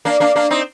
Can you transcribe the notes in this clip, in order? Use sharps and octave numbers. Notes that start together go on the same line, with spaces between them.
A#3 D4
A#3 D4
A#3 D4
C4 D#4